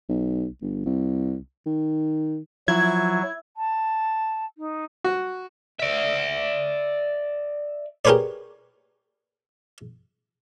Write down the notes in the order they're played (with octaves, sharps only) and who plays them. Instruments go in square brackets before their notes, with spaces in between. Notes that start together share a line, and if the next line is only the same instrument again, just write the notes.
[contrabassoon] B1
G1
C2
D#3
[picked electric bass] F3 [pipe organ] F#3 [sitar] E4 [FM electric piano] G#6
[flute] A5
D#4
[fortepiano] F#4
[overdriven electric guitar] D5 E5
[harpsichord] G4 G#4 A#4 B4 C#5 D5